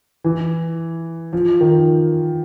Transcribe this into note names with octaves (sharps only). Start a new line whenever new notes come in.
E3
F3
D#3